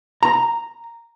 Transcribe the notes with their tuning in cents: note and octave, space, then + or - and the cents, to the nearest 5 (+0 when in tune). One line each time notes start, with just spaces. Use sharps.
A#5 -5